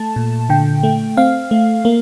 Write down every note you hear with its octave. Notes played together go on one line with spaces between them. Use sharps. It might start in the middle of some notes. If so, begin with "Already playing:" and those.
Already playing: A3 A5
A#2
D3 G5
A3
C4 F5
A3
A#3